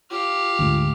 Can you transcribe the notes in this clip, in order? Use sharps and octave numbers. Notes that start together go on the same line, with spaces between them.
F4 G4 F5
D2 G#2